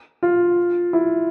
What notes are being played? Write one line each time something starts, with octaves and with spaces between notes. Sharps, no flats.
F4
E4